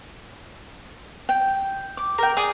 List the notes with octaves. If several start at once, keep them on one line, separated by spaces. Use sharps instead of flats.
G5
D6
A#4 G5
G#4 D5 D#6